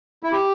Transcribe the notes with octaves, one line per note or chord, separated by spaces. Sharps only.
E4
G4